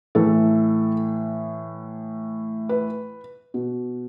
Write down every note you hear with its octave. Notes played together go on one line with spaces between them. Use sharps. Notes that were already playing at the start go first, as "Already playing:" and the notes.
A2 E3 A4
B4
B2